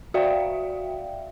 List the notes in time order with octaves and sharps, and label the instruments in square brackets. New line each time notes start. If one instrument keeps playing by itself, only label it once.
[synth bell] F#4 D5 E5 F5 G5